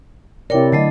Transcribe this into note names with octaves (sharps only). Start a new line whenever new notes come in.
C3 C4 E4 A#4 C#5 D5 G5
D3 F#3 A3 D#5